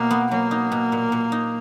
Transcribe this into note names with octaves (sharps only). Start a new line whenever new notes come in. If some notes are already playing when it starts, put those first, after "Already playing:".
Already playing: B2 A#3
B3
F#3 A#3
D#4
B2
A#2
A#2
D#4